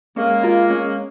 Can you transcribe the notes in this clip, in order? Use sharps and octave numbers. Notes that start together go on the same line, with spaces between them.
G#3 A#3 C#4
F4 A#4
C#4